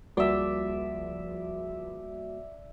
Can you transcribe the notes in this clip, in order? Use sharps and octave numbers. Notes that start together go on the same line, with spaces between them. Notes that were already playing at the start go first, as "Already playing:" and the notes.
C#2 F3 G3 A#3 F#4 D5 E5